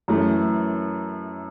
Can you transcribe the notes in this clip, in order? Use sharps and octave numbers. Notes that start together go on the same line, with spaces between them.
F#2 E3 A3